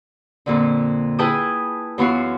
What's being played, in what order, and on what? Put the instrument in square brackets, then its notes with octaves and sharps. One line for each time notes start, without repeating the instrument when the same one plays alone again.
[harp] F2 A#2 D3
E4 G#4 B4 G5 A5 D#6
F#2 E3 B3 F4 F#4 F5